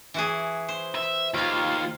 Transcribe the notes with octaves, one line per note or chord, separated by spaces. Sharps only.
E3 F#4 G#4
C5
E5
D#2 F4 F5 G5